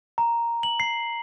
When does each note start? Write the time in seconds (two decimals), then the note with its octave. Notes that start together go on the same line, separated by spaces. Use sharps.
0.18 A#5
0.63 F#7
0.80 C7